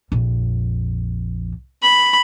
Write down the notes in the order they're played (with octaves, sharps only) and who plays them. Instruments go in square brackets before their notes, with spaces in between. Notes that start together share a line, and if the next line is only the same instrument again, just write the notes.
[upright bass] A#1 F2
[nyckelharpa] B5